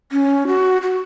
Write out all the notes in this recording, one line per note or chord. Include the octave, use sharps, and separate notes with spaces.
C#4
F#4
F#4